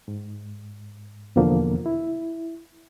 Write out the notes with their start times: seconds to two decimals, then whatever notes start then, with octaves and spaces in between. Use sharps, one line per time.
0.08 G#2
1.36 E2 B2 D3 F3 A#3
1.86 E4